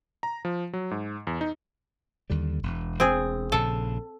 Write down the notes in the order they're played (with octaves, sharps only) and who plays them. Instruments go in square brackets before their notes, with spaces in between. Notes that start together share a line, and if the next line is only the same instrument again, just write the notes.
[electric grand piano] A#5
F3
F#3
G#2
E2
D#4
[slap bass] D#2 D3 G3
E1
[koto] C4 G#4
[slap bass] A#1 C#3 [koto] A4